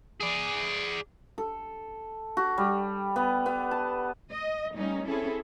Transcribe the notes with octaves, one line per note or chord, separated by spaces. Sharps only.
G#4 D5
A4
F#4
G3
B3
B3
A5
D#5
G3 A3 A#3 C#4 D#4
C4 C#4 E4 G#4 A4